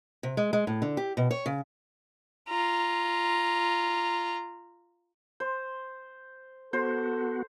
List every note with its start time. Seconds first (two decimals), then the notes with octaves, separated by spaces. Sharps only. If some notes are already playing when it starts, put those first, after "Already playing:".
0.23 C3
0.37 G#3
0.53 G#3
0.67 A2
0.82 D3
0.97 G4
1.17 B2
1.31 C#5
1.46 C#3
2.49 F4 A#5
5.40 C5
6.73 B3 F#4 A4 C5